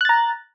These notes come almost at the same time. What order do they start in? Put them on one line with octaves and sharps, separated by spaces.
F#6 A6 A#5